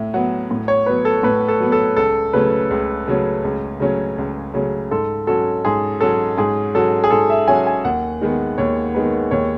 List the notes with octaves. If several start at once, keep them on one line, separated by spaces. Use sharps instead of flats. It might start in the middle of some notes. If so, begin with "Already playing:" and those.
Already playing: A2 E5
F#3 B3 F#5
A2
C#5
F#3 B3 B4
A4
A2 B4
A4
F#3 B3
A4
C#2 A4
C#3 F#3 A3 C#4 B4
C#2
C#3 F#3 A3 C#4
C#2
C#3 F#3 A3 C#4
C#2
C#3 F#3 A3 C#4
G#2 A4
F#3 C#4 F#4 A4
G#2 G#4
F#3 C#4 F#4 A4
G#2 G#4
F#3 C#4 F#4 A4
G#4
G#2 A4
E5
F#3 C#4 F#4 G#5
G#5
D#2 F#5
D#3 G#3 B3
D#2 C#5
D#3 G#3 B3 B4
D#2 C#5